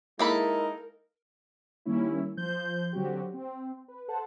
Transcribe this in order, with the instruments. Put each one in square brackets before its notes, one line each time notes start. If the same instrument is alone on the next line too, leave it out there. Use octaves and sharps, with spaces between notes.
[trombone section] G#3 E4 [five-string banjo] A#3 A4 B5 [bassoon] D#4 [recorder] A#4
[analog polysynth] D#3 G3 A#3 C#4 E4
F3 C5 G6
D3 F#3 C4 F#4 G4
C4
B4
A4 C5 F#5 A5